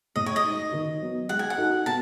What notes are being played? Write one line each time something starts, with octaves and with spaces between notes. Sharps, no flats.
A2 D#5
C#5
D#5
G#3 D#4
D#3
F#3 B3
G#3 F#5
G#5
F#5
D#4 F#4 A4
B2 A5